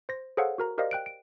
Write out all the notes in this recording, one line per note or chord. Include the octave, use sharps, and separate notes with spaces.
C5 A#6
G#4 A4 C5 C#5 F5 F#5
F#4 A#4 A#5
G4 A#4 C5 D5 D#5 F5
G5 F#6 D7
D7